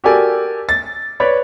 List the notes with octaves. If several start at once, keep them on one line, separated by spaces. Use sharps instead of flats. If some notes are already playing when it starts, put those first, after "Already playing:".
F#4 G4 A4 A#4 D5 G#5
A6
B4 C#5 D5 B5